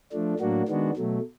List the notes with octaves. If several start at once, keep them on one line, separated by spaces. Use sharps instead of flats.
F3 A3 D4
A2 F#3 A#3 D4 F#4
D#3 G#3 B3 D4 F#4
B2 F#3 A3